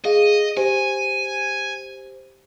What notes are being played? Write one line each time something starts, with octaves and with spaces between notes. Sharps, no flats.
G#4 D#5 F5
G4 C5 G#5